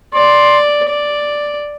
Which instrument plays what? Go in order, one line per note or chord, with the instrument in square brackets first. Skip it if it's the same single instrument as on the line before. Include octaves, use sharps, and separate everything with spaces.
[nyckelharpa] D5 [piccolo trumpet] C6
[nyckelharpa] D5